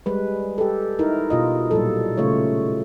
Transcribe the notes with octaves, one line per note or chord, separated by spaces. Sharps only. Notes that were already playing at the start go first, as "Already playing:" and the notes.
G3 G#3 B4
G4 A4
D#4 E4 A#4
B2 F4 D#5
A#2 F#3 G3 A4
C#3 A3 F4 C#5